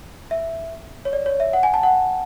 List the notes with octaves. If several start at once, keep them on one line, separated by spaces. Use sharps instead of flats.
E5
C#5
D5
C#5
E5
F#5
G#5
A5
F#5